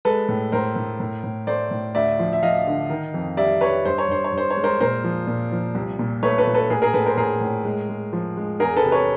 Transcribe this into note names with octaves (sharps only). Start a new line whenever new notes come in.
G#3 A4 B4
A2
A2 A#4 C5
A2
A2
A2
A3 C5 D5
A2
D2 D5 E5
F3
E5
F3 D#5 F5
D3
D#3
F2
G3 D5 E5
G3 B4 C#5
G2 C5
C#5
G2 C5
C#5
G2
C5
C#5
G#3
A#4 C5
A#2 A#4 C5
F3
A#2
F3
C2
A#2
A3 B4 C#5
A4 B4
A#2
A4 B4
A2 G#4 A#4
G#4 A#4
A2 A4 B4
A#4 C5
A2 G#4 A#4
A2
G#3
G#3
F3
G#3
E2 G#4 A#4
A4 B4
C3
B4 C#5